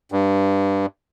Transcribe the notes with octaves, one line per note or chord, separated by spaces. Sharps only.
G2